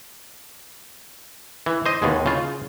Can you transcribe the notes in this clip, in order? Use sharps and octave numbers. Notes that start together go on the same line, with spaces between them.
E3
C5 D#5
D#2 B2 G#3
C#3 F4